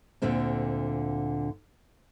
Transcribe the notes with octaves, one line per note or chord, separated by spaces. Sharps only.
D2 A#2 D3 C4